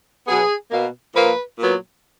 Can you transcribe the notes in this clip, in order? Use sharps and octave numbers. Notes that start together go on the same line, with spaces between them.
B2 F#3 B3 G#4
B2 A#3
A#2 F3 A#3 B4
A#2 F#3 B3